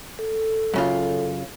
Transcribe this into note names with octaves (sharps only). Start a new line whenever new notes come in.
A4
F#2 C#3 F4